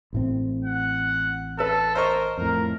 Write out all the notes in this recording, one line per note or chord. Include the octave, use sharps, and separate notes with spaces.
A1 A2 C4
F#5
A4 B4 E6
A#4 C5 D#5 C#6
F2 A2 A#4